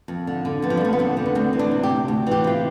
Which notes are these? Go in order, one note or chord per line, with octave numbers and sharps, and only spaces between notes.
F2
D3
D3
F2 B3
F3
G3
F2 A3
B3
D3 C4
D3
B3
D2 C4
E3
D4
C3
G4
D2
D2
E3 G4
C3 F4